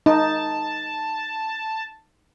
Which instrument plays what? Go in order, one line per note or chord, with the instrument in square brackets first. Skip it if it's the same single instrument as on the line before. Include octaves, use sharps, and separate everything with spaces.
[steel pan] D#4 [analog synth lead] A5